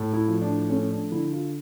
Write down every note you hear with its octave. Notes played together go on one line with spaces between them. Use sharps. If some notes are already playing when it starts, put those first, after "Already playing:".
Already playing: A2
E4
F3
D4
A3 C#4
D4
D3 E4
F4